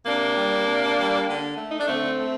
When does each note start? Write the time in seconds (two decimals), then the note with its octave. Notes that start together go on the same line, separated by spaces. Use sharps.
0.06 C3 A#3 D4
0.37 G3
0.66 C3
0.97 G3
1.28 D3
1.57 A3
1.71 D#4
1.80 D4
1.88 D3 A3 C4
2.18 A3